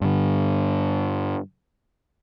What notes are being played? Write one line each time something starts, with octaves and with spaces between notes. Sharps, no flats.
G2 D3